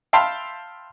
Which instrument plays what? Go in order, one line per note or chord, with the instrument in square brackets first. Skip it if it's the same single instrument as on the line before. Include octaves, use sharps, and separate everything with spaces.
[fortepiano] E5 F5 G5 A5 B5 C6